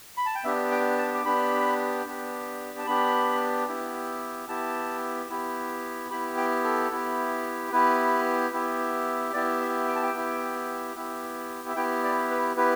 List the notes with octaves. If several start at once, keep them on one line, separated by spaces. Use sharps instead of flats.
B5
A5
G5
B3 D4 G4 E5
G5
A5
D6
B3 D4 G4 B5
B3 D4 G4
A5
B3 D4 G4 B5
B3 E4 G4
B3 E4 G4 A5
B3 E4 G4
B3 E4 G4 B5
G5
A4
B3 E4 G4
B3 E4 G4 B4
B3 E4 G4
B3 E4 G4 D5
E5
G5
A5
G5
B3 E4 G4
B3 E4 G4
E5
B3 E4 G4 G5
D5
B4
B3 E4 G4 B4